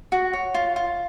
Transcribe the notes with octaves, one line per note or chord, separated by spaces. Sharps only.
F#4
C#5
F4
F4